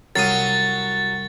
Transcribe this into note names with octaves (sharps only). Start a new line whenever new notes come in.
C2 F#3 F5 D#6 A6